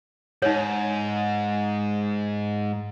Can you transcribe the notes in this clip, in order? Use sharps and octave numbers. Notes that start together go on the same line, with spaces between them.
G#2 D#4 C#5